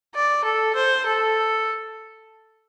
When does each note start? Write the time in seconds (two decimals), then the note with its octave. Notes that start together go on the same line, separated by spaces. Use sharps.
0.15 D5
0.44 A4
0.75 C5
1.06 A4